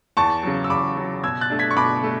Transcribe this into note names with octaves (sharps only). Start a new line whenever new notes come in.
E2 A5 C#6
C#3 F#3
E6
E2 B5 D6
C#3 F#3
B2 E6 G#6
F#6 A6
A3 D4
G#6 B6
C#6
B2 B5 D6
A3